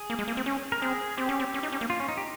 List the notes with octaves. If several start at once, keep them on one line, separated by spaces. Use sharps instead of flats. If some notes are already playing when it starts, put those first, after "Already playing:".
Already playing: G#4
A#3
G#3
A#3
C4
C#4
A#4
C4 G#4
C4 G4
C#4
C4
C#4
D#4
C#4
A#3
F4
C#4
D#4
G4